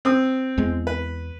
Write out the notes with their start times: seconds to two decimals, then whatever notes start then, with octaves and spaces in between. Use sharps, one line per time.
0.05 C4 D#6
0.58 E2 G#3
0.87 B4